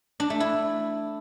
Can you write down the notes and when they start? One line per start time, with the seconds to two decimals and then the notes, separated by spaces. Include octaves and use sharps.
0.20 D4
0.30 A3
0.40 E4